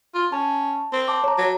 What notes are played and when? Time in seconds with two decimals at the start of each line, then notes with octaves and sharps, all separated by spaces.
0.15 F4
0.32 C#4 A5
0.93 C4
1.08 A5 D6
1.24 C#5 A#5
1.38 F#3